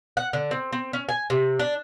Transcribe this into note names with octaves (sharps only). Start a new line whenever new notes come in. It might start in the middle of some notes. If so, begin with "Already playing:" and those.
F#5
D3
C4
C4
C#4
G#5
C3
D4